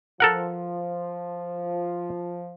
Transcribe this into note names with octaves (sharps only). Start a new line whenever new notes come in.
F3 A4 A#4 F#5